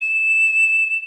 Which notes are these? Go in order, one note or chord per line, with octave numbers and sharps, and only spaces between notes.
E7